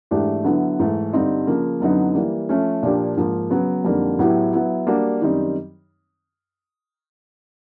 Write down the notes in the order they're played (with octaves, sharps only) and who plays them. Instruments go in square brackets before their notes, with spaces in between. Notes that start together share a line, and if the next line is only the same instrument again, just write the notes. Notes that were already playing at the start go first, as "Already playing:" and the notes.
[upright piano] G#2 E3 A3 D4 G4
D3 F#3 B3 E4
G#2 E3 A3
G2 D3 G3 C4 D#4
C#3 F3 A#3
F#2 D3 F#3 B3 D#4
E3 G3 A#3
F3 A3 C#4
A#2 F3 A#3 D4 G4
G#2 F3 A#3
C#3 F#3 B3
F2 D3 G3 A#3 D#4
A2 F#3 B3 E4 G4
F#3 B3 E4
G3 A#3 D4 F#4
F#2 D#3 G3 C4 D#4